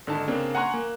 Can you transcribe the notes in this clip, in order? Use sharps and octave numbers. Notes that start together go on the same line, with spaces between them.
G#1 D3 D#4 A5
C#3 A#3 C4 D4
F#5 G#5 A#5 C6 C#6 F#6
A#3